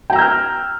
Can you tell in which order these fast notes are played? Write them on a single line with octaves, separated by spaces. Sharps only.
G5 A#5 E6 G6 F6